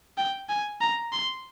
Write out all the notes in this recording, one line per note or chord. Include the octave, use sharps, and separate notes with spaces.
G5
G#5
A#5
C6